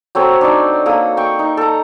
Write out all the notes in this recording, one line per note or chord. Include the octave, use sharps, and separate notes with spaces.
F#3 C4 A4 C#5
D4 D#4 D5
A#3 A4 D#6
G5 C#6
D#4
A4 A#5